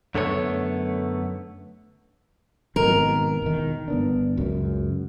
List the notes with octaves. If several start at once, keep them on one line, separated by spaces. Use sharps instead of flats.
F#2 D3 A3 B3 F#4 C#5
G#1 B2 D#3 A#4
E1 D#3
G1 B3 D4
C#2 F#2